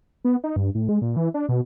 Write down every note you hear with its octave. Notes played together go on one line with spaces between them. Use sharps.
B3
D#4
G2
A2
G#3
A#2
E3
D4
B2